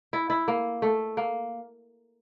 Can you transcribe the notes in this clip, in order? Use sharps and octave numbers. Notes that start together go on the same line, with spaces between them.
E4
E4
A#3
A3
A#3